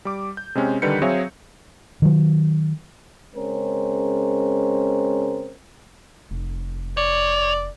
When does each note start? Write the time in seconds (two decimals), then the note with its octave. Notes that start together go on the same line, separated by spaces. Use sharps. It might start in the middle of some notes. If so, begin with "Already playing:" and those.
0.05 G3 D6
0.37 G6
0.55 C3 G#3 C4 C#4
0.82 D3 D#3 G3 B4 G6 C#7
1.02 F#3 C4 G#4 C#5 E5 F5
2.02 D#3 F#3
3.36 C#3 G#3 C4 C#4 A#4
6.31 F1
6.97 C#5 D5